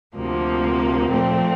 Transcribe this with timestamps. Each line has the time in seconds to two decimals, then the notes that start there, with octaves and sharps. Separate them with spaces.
0.15 D2 C3 F3 A#3
1.10 A#2 F3 A3 C4